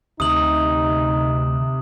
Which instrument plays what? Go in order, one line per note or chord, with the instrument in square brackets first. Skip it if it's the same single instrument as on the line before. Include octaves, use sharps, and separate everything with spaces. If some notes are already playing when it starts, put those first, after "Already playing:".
[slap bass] D2 [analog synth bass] C3 [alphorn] D#4 [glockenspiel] D#6 F#7